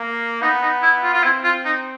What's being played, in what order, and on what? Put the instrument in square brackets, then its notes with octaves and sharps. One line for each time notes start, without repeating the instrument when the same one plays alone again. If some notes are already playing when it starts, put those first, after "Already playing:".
Already playing: [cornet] A#3
[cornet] B3 [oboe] D#4
[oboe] D#4
E4
F4
F4
[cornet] C4 [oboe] E4
[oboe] F4
D#4